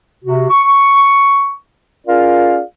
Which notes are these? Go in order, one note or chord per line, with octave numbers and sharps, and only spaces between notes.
C3 F#4
C#6
C#4 F4 G#4 A#4 D5 F5